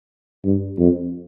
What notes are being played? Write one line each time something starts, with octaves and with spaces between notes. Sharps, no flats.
G2
F2